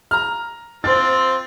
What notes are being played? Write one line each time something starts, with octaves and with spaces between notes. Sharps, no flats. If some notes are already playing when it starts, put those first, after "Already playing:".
A#5 F6
C4 F4 C5 A6